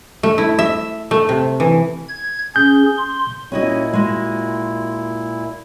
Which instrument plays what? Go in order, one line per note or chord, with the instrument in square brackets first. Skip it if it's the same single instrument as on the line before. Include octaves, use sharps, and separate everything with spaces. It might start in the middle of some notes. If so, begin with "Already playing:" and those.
[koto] A3
E4
E5
A3
C3
E3
[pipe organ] G#6
[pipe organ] C#4 G#4 [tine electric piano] G6
[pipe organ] C6
[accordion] A#2 E4 [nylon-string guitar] C#4 F#4 D#5
[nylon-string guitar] G#3 F#4